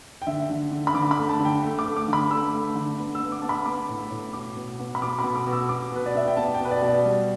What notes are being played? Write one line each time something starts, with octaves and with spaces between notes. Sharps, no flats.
G5
D3 E5
D3
D3
B5
D3 D6
B5
A3
A5
D3
G5
A3
D6
A3
D6
D3 B5
A3 E6
A3
D3
B3
E6
B3
D6
B3 A5
B5
B3 D6
A2
A2
B2 D6
B2
B3
B5
B2 D6
B5
B2
D6
B2
E6
B2 D6
B2 B4
D5
B3 E5
G5
B3 A5
G5
B2 B4
D5
B2
D5
G3